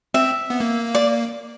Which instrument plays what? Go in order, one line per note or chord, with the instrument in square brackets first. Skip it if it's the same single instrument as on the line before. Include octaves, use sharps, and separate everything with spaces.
[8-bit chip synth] C4 [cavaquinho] E5
[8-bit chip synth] B3
A#3
[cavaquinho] D5